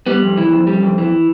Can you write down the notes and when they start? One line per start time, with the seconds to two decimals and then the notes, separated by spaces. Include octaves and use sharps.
0.07 G3 B3
0.22 F2
0.38 E3
0.53 F2
0.67 G3
0.83 F2
0.98 E3